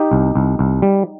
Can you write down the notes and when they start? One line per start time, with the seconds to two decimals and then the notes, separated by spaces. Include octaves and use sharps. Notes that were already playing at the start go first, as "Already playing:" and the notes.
Already playing: D#4 G4
0.11 C2
0.35 C2
0.59 C2
0.82 G3